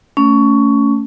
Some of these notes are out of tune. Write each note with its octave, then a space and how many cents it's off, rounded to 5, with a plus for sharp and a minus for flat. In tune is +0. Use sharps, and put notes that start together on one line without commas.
A3 +15 C#4 +15